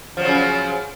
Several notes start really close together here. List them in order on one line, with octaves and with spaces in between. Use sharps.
F3 F#3 C#3